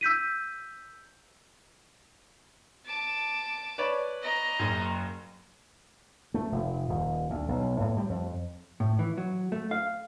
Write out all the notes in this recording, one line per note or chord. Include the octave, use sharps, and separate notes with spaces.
E6 G6 B6 D#7
A5 D6
B4 C#5 D5
D#5 A#5
F#1 F#2
A3
F1
D#1
D2
B1
A2
G3
F2
A2
E3
F#3
A3
F5